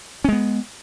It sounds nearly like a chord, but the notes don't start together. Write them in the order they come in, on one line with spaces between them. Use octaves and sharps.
C#4 G#3 B3